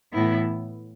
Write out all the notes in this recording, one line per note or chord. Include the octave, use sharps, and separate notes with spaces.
A2 E3 B3 E4